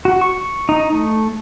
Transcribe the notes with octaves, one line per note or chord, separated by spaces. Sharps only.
F#4
C#6
D#4
A3